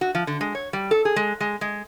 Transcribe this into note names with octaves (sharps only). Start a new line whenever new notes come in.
F#4
F3
D3
G#3
C#5
G3
A4
G#4
G#3
G#3
G#3